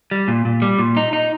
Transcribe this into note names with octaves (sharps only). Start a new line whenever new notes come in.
G3
A#2
A#2
G3
A#2
D#4
D#4